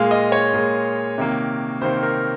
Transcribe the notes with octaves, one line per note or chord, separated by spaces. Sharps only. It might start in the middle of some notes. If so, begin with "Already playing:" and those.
Already playing: A#2 G#3 F5
D#5
C#5
A#2 G#3
C3 D#3 A#3
C3 D#3 A#3 C5
A#4